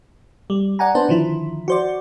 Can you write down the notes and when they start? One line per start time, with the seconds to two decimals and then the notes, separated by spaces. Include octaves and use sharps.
0.50 G3
0.79 D5 F#5 G#5 A#5
0.95 B3 D4 B4 C5 A5
1.09 D3 D#3 F3 E4
1.68 F#4 C5 D5